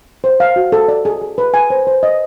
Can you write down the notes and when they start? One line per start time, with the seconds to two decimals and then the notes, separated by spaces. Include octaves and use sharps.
0.24 C5
0.40 F5
0.56 F#4
0.72 A4
0.88 D5
1.05 G#4
1.21 G#4
1.38 B4
1.54 G#5
1.70 C5
1.87 C5
2.03 D#5